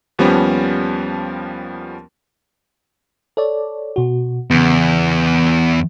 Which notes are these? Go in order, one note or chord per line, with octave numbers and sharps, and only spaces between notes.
D#2 F3 G3 B3 C#4
A4 C#5 D5
B2 F#4
E2 C#3 B3